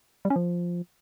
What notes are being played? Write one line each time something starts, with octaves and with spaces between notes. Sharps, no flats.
G3
C#4
F3